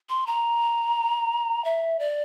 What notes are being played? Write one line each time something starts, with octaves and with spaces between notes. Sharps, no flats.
C6
A#5
E5
D5